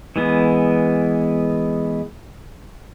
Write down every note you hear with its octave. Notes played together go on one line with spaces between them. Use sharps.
E3 G#3 B3